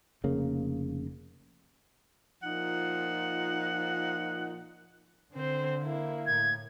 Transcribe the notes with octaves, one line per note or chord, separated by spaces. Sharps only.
F1 C#3 A#3
A#2 F3 D#4 F#5
D3 C4 C5
A#3 E4
A2 G#6